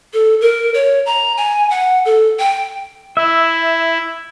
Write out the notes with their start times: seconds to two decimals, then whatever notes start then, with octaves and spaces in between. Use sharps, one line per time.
0.13 A4
0.41 A#4
0.74 C#5
1.06 A#5
1.37 G#5
1.70 F#5
2.05 A4
2.39 G5
3.17 E4 E5